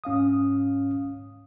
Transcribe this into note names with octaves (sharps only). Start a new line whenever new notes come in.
G#2 C#4 F5 D#6